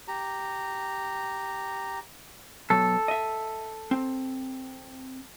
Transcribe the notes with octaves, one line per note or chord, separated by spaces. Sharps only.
G4 A#5
B2 F#3 A4
D#5 E5
C4